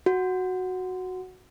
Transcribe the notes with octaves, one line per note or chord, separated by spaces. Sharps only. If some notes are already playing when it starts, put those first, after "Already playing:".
F#4